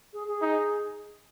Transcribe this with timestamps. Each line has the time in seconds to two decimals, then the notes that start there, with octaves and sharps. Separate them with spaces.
0.13 G#4
0.27 G#4
0.42 D#4